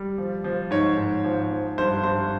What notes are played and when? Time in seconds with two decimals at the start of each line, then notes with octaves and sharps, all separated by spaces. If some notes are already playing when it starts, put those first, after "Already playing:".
Already playing: G3
0.18 F3
0.44 F3
0.71 G#2 C#5
0.97 G#2
1.24 F3
1.51 F3
1.78 G2 C5
2.04 G2 C5